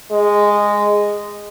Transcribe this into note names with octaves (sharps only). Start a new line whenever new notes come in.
G#3